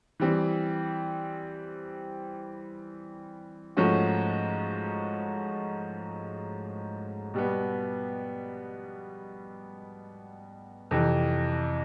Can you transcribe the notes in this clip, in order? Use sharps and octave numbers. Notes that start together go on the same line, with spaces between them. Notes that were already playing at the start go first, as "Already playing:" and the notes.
E3 G3 C4
G#2 F3 A3 C#4 F#4
B2 G3 B3
F2 C3 E3